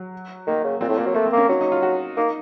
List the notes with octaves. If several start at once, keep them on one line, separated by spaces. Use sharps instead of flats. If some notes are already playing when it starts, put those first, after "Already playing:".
Already playing: F#3
D#3 A#3
C#3
A#2 C4
A2
A#2 A#3
F#3
A3 A#3
C4
A#3 C#4
F#3 D#4
D#4
F4
F#4
A#3 D#4